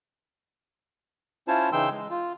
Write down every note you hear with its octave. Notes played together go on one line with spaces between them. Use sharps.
C#4 E4 F4 C5 C#5 A5
C#3 E3 D#4 G5 C6 E6
G#3
F4